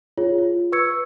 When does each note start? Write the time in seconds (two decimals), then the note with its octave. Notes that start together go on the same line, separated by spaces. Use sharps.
0.18 F4 G#4 C#5
0.38 F4
0.72 B4 C#6 E6 G#6 C#7